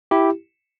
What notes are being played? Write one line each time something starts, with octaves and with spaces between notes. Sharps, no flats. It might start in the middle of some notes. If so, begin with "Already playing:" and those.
E4 G4